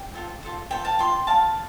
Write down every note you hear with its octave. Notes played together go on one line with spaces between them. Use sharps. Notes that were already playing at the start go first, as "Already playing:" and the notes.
Already playing: G5
F4 A4 C5
F4 A4 C5
F4 A4 C5 G5
F5 A5
F4 D5 G5 C6
F4 D5 F5 A5